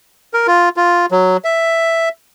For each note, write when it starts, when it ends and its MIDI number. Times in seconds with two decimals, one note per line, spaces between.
0.34 0.47 70
0.47 0.69 65
0.77 1.06 65
1.11 1.37 54
1.44 2.09 76